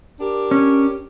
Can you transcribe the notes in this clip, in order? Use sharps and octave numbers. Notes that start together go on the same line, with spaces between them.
D4 G4 A#4
C#4